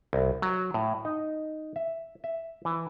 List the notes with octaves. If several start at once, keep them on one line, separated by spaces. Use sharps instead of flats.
C2
F#3
A2
D#4
E5
E5
E3